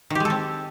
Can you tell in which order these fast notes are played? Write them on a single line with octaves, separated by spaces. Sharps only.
D#3 G4 G#3 A4 C4